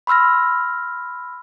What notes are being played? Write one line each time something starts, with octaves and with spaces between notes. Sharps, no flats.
B5 C6 E6 F6 A#6